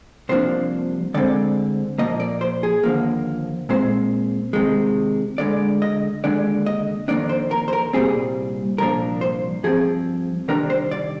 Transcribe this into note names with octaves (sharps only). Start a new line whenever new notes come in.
C2 C3 F3 A#3 D4 C5
D2 D3 G#3 C4 D5
A#2 F3 A#3 D#5
D5
C5
G#4
D#2 D3 F3 A#3
A#2 G#3 C4 C5
C3 D#3 G#3
D2 D3 G#3 D5
D#5
D#2 D3 G#3 D4 D5
D#5
F2 D#3 A#3 D4 D5
C5
A#4
C5
A#4
C2 A#2 G3 C4 G#4
C2 A#2 F3 A#3 D4 A#4
C5
G2 F3 C4 G#4
C3 D#3 G3 D4 A#4
C5
D5